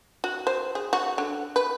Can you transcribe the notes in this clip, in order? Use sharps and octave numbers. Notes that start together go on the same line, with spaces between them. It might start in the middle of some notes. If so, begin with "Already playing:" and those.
F#4
C5
G#4
F#4
D3
B4